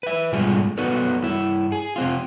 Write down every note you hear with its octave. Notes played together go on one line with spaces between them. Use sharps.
B4 E5
G#2 B2 D3 G3 F4 G#4
B3 D#4 F#4 A4 B4 D5
G2 E4
G#4
C3 C4 F4